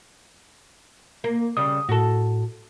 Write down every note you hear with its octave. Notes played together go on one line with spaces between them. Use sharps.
A#3
C#3 G3 D#6
A2 F#4 A4